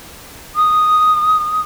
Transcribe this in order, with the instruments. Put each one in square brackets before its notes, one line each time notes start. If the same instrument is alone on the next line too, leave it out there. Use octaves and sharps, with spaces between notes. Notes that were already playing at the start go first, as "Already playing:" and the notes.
[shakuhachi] D#6